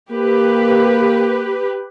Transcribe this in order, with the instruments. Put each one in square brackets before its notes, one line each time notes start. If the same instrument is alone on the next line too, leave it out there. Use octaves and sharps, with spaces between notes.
[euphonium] A#3 [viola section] G4 B4